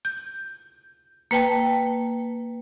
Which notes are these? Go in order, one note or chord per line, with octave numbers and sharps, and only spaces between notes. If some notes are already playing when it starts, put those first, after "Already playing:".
G6
A#3 B4 G5 A5